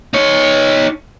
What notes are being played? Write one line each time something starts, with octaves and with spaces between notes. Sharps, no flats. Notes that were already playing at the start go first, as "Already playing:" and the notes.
D#4 C#5